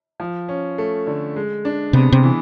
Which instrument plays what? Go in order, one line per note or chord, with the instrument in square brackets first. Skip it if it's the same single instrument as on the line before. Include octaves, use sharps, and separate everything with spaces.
[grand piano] F3
C#4
A3
D3
G#3
D4
[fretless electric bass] C3 [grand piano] B3
[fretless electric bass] C3
[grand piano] E3